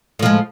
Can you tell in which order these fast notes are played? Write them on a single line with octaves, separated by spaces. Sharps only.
A2 F3 G#3